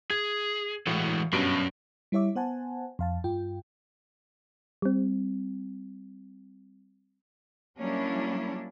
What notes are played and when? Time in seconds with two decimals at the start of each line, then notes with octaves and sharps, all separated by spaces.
0.10 G#4 G#6
0.87 A2 E3 G#3 F#4
1.33 G2 B2 F#3 C#4 D7
2.12 G3 E4 C#5 E5 D6
2.35 B3 C5 F#5 G#5 A5
2.99 F2 F5 A5
3.24 G2 F4 G5
4.82 G3 C4
7.78 F#3 G3 A#3 C#4 D4 E4